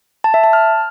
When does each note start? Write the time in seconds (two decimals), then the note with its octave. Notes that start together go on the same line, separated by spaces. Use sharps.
0.24 A5
0.34 E5
0.44 A5
0.53 F6